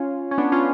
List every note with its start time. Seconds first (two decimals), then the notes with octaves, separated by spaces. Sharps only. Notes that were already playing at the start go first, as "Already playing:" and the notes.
Already playing: C#4 F4
0.31 C#4
0.38 B3 D4
0.52 C#4 F4